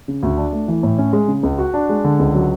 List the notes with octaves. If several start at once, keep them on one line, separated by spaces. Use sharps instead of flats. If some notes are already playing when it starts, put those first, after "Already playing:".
C#3
D2
D4
A3
E3
A2
C#4
G#3
C#3
C#2
F#4
D4
G#3
D3
C#2
F#3